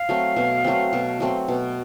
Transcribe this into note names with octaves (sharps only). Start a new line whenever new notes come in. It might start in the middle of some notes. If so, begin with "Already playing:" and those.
Already playing: F5
F#3 A3 C4
B2
F#3 A3 C4
B2
F#3 A3 C4
B2